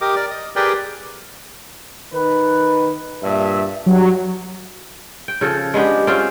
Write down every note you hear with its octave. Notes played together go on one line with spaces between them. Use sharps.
G4 A#4 D#5 D6
A#4 D5
D#5
G4 G#4 A#4 B4 D5 G5
D#3 B4
G2 A#2 E5
G2 F#3
G5
C#3 F3 A4
G#3 B3 D4 G4
C4 C#4 F4 C5